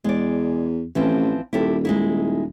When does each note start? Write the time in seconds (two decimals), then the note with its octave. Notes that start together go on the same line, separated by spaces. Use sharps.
0.04 E2 G#3 D5
0.95 A1 E3 F3 C4
1.53 D#1 E4 G4 A4
1.85 G#3 D#4 E4